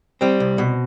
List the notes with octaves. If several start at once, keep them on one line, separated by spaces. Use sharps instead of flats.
G3 C4
C2
B2